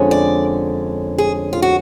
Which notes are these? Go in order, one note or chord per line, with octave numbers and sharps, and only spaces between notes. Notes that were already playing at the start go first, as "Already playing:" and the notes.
Already playing: F2 D3 G#3 C#4
D5
G#4
F4
F#4